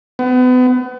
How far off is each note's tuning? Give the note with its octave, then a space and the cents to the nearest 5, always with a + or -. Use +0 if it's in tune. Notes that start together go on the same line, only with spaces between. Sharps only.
B3 +35